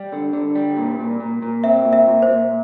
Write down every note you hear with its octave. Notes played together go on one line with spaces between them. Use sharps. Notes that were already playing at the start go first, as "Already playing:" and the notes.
Already playing: G3
D3
D3
G3
A#2
A#2
A#2
A#2
C4 E5
A#2
E5
A#2
C5
A#2